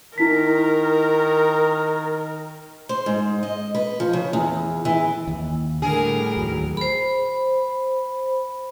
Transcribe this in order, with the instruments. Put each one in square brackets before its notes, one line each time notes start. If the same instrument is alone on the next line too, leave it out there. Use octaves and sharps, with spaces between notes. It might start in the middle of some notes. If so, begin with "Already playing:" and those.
[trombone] D#3 [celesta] D#4 E4 B6 [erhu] A#4
[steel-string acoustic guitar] C5
G#2
D#5
B4
F3
C#3
E2
E3
[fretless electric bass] D#2
[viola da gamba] A2 G3 A#4 [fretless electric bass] D3 [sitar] G#4
[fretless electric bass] D#2 F#3
[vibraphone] C5 B5